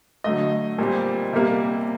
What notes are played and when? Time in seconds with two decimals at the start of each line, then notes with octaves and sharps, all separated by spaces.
0.24 D3 F#3 A3 D#5
0.78 A#2 G3 C4
1.33 C3 G3 A#3